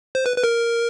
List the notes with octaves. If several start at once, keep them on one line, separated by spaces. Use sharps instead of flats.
C5
B4
B4
A#4